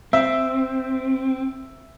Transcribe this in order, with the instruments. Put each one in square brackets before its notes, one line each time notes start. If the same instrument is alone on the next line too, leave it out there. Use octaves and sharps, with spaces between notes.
[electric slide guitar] C4 [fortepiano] E5